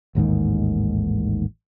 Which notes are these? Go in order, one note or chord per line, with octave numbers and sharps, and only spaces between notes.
A1 D#2 G#2 D#3